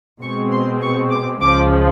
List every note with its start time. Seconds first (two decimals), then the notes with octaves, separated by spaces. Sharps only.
0.21 B2 G#3 C4 C#6
0.51 C6
0.81 C#6
1.11 D6
1.41 C#2 C#3 F3 G#3 D6